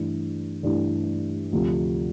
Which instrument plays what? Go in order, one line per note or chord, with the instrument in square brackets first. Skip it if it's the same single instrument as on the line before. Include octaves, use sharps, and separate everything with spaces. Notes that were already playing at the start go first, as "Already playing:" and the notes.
Already playing: [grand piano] G2 E3 A3 D4
G2 E3 A3 D4
D2 C3 F3